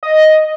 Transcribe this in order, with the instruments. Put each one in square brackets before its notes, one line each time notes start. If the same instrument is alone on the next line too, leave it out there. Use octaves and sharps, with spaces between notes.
[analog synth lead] D#5